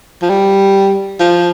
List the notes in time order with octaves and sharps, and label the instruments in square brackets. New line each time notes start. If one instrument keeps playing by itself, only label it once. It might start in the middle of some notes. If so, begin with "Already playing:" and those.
[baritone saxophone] F3
G3
F3